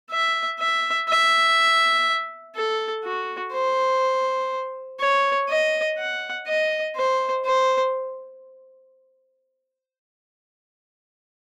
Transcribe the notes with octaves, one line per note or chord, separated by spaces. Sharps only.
E5
E5
E5
A4
F#4
C5
C#5
D#5
F#5
D#5
C5
C5